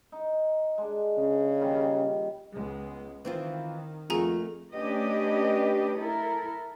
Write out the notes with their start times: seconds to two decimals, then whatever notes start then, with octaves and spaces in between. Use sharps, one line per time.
0.12 D#4
0.78 G#3 D4
1.18 C#3
1.61 A#2 D#3 G3
2.54 C#2 G#3 B3
3.25 D#3 E3 C4 F4
4.10 F2 A3 A#3 F#4 G#4 G#5 A#5
4.73 A3 C#4 D4 G4 B4 D#5
5.99 E4 A4 A#4